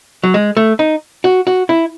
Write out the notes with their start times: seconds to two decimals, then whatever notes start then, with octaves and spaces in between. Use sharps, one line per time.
0.23 F#3
0.34 G#3
0.57 A3
0.79 D#4
1.24 F#4
1.47 F#4
1.69 E4